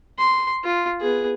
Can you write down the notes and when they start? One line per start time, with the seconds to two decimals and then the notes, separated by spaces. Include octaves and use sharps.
0.18 C6
0.64 F4
1.01 B3 G#4